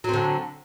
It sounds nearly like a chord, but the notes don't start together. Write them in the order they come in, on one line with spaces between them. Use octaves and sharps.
F#3 C4 D3